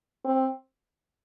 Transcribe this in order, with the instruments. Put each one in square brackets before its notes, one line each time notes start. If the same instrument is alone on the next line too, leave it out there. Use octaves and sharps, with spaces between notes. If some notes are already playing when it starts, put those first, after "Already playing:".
[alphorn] C4